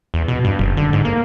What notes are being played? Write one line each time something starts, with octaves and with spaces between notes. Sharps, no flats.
E2
B2
G2
F#1
D3
G#2
A#3